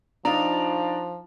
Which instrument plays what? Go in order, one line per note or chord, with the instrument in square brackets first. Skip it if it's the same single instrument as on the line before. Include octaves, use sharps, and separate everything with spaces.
[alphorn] F3 [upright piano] D4 D#4 F4 [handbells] A#5